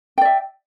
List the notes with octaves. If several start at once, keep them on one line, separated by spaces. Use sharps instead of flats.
D5 E5 G5